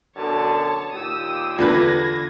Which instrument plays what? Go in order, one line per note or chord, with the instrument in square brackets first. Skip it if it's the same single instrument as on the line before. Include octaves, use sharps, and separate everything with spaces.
[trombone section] F#2 B2 D3 [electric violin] C#5 A5
[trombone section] D#2 A#2 G4 [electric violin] D#6 E6
[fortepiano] E2 D3 B4 [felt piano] F4 [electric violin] G#6 A#6